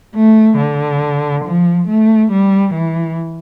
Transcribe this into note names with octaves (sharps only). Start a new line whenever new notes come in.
A3
D3
F3
A3
G3
E3